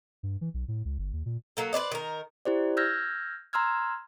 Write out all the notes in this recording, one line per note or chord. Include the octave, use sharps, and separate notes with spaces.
G2
E3
B1
A2
C#2
G1
D#2
A#2
F#3 A#3 A4
B4 C5 D5 D#5
D#3 A#4
E4 G4 C5 D5
E6 F6 G6 G#6 A#6
A#5 C6 E6 F6 G#6